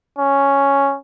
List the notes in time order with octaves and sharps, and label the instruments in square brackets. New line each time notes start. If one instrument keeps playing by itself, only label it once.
[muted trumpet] C#4